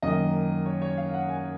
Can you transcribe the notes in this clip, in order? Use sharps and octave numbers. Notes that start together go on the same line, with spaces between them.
F#2 D#3 A#3 D#5
C#5
C#5
F5
F#5
G#5